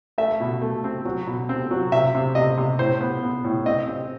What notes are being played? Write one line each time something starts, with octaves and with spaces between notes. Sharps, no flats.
A3 E5
B2
A3
C4
F#3
B2
C4
F#3
C3 E5
C3
C3 D#5
C3
A2 C5
B3
B3
A2
C4 D#5
C4